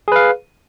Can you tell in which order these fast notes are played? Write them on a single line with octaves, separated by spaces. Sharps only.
G#4 B4 F5